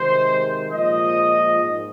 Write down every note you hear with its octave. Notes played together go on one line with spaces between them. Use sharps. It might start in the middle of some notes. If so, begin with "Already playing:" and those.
Already playing: C3 D#3 G#3 C5
A#2 F3 G#3 D#5
G#2